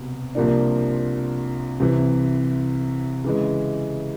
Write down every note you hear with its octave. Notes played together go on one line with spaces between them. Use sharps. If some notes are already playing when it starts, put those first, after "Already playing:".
Already playing: C2 B2
C2 A#2 F3 A#3 D4
C2 C3 E3
C#3 E3 G#3